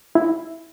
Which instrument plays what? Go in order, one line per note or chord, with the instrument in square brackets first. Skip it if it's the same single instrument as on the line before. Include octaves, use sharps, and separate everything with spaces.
[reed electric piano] E4